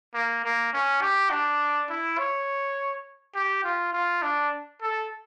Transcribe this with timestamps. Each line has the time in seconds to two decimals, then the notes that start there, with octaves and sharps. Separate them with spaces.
0.14 A#3
0.44 A#3
0.73 C#4
1.02 G4
1.30 D4
1.89 E4
2.18 C#5
3.35 G4
3.64 F4
3.93 F4
4.22 D4
4.82 A4